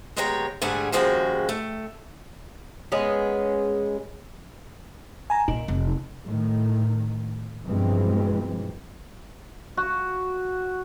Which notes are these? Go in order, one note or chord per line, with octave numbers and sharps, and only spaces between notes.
D#2 G#3 B3 C#5 G5 A#5
G#2 D3 G3 A3 G#4 G#5
D#2 C#3 F3 G#3 F#4 G5
A3
G#3 B3 C#4 G#4
G#5 A#5
A#2 D#4
F1
A2 D#3
G2 B2 E3 F3 G#3 C4
F#4